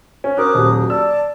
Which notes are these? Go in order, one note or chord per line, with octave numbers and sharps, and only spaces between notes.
C#4
F#4 A#4 C5 D6 D#6 F#6
D#1 F#3
D5 A5 E6